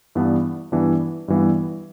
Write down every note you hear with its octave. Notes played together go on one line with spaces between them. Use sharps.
G2 E3 B3 D4
G2 E3 B3 D4
G2 E3 G3 B3